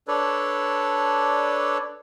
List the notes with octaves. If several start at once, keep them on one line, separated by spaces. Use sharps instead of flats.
D4 A4 B4 C#5 D5